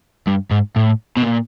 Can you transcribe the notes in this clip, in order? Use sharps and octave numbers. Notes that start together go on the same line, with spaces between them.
G2
G#2
A2
B2
A#2